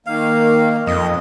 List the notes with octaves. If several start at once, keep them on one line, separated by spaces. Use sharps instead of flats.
D#3 A#3 F5
F2 D#5